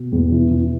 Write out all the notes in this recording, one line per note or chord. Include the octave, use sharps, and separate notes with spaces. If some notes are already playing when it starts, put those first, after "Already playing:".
Already playing: B2
E2
E3
E3